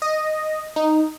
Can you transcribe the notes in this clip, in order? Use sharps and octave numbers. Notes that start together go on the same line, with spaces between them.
D#5
D#4